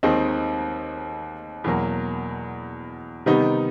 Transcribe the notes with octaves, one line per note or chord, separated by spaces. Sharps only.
D#2 D#3 G#3 C4 D#4
E2 B2 F#3 A#3
C3 D#3 G3 B3 D#4